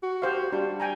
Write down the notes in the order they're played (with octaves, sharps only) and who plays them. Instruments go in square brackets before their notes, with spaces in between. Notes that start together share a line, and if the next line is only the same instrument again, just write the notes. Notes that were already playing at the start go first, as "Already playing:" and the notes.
[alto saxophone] F#4
[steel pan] G4 C5 F5
[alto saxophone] G3 [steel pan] D4
[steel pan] G5 G#5 A#5